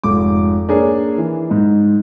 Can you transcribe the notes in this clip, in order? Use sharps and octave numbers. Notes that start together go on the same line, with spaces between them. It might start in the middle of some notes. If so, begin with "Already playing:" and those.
F1 G#2 D6
A#3 D4 G#4 A#4 C#5
E3
G#2 D#4